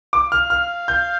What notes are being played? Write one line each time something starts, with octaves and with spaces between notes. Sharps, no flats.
D6
F5 F6
F6
G6